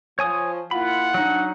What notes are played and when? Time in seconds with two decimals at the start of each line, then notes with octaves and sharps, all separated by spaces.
0.19 F3 C#5 G#5 D#6
0.71 A#3 E4 F4 F#5 B5
1.14 F#3 D4 D#4